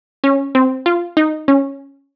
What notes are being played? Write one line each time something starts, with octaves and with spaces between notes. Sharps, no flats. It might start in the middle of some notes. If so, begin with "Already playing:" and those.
C#4
C4
F4
D#4
C#4